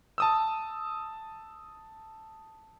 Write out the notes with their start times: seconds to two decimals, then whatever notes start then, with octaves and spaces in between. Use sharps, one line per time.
0.18 A5 D#6 E6